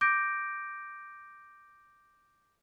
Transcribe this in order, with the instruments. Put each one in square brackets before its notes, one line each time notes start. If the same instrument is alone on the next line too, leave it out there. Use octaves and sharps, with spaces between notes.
[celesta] D6 G6 A#6 D7